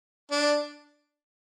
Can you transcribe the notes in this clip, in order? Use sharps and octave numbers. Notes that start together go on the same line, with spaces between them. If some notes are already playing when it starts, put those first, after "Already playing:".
D4